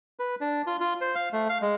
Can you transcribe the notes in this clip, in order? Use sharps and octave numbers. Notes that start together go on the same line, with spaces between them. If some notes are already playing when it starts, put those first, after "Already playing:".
B4
D4
F4
F4
C5
F5
A3
F5
G#3